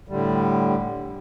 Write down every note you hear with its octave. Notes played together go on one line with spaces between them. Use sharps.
A2 D3 G3